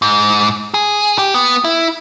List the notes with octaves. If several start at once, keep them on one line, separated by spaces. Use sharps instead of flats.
G#2
G#4
G4
B3
E4